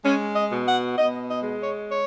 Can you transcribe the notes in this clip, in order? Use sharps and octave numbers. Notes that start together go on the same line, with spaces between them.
G#3 C#4
D#5
B2
F#5
B2 D#5
D#5
G#3
C#5
C#5